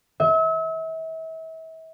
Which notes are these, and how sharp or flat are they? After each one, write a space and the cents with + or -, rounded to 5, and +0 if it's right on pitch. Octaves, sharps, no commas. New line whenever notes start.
E5 -35